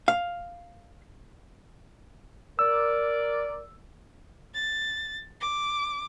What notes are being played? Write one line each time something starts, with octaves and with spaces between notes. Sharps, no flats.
F5
A#4 D5 E6
A6
D6